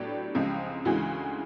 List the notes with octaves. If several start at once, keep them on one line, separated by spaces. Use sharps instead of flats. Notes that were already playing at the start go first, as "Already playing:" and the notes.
Already playing: A2 F#3 B3 D4 G4
C#2 C#3 F3 G#3 C4
D2 C#3 E3 G#3 F#4